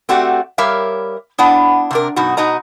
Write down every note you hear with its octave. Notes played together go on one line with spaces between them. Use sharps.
A3 C4 F#4 G4 D5 F#5
G3 G4 A#4 C#5 E5 F5
B3 D4 E4 F#5
C3 D4 A#4
F#2 B2 D#4 F#4
B2 D#4 F#4 D#5 A#5